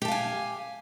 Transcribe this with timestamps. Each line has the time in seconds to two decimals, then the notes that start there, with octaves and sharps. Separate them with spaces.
0.02 G4
0.05 A5
0.08 F5
0.11 G#5